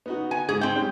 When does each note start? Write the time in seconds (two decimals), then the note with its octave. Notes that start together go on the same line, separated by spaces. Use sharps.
0.06 B3 D#4 F#4
0.31 G#5
0.49 G#2 G#4
0.61 C4 D#4 G5
0.75 G3 G#3 C#4